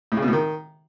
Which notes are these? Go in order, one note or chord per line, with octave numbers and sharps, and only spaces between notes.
A2
C#3
B2
A2
D#3